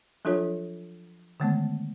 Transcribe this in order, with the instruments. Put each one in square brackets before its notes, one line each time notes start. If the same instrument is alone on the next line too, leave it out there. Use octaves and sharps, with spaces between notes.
[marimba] F3 F#3 D4 F4 A4 C#5
D3 D#3 G#3 A3 B3